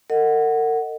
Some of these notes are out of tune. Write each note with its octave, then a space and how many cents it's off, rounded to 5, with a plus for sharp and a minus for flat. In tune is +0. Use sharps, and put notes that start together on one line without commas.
A#4 -45 D#5 +0 F#5 +0